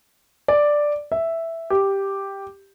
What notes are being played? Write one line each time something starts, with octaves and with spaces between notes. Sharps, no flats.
D5
E5
G4